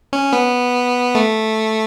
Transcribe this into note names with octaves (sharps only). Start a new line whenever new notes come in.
C#4
B3
A3